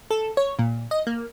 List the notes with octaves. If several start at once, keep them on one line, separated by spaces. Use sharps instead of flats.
A4
C#5
A#2
D#5
A#3